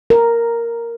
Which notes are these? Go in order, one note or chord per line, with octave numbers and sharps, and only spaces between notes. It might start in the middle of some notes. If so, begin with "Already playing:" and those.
A#4